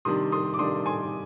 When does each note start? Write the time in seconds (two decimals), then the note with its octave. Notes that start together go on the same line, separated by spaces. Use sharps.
0.05 C3 D#3 G3 D4 C6 D#6
0.32 C6 D#6
0.54 D6
0.59 C3 D#3 G3 D4 C6 D#6
0.86 G#5 C6